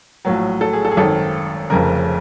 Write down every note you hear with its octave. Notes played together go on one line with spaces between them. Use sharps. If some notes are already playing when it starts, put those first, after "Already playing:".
A#1 A2 F#3
A4
G#4
A4
G#4
G#1 F#2 D#3 A4
F1 F2 C#3 A#4